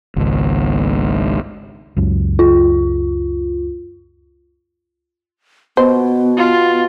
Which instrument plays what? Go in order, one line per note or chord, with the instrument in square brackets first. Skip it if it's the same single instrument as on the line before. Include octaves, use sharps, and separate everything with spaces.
[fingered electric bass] G#1 C#2
C#2 F#2
[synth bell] F4
[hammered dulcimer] B2 [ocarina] B3 [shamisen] C5
[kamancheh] F4